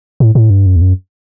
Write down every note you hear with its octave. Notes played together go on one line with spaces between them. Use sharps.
A2
A2
G2
F#2
E2
F#2